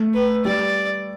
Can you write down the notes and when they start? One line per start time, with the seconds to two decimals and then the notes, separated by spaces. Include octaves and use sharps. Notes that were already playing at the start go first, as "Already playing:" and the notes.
Already playing: A3
0.14 B4
0.45 G3 D5